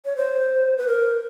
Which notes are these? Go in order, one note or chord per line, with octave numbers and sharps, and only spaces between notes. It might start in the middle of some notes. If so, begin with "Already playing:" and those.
C#5
C5
B4
A#4